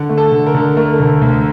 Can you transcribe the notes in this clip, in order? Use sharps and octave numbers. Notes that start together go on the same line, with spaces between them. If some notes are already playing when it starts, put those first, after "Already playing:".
Already playing: D3
A3
A4
D3
A#4
D3
A3 A#4
D2
D2